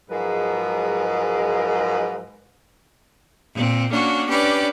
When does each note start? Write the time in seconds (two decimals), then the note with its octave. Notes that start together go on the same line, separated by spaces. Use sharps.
0.10 G#2 F3 F#3 G#3 A#4 B4
3.54 A#2 C4
3.91 A#3 C#4 D4 F#4
4.29 C#4 D4 G4 B4 D5